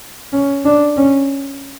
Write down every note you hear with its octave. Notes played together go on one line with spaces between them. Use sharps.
C#4
D4
C#4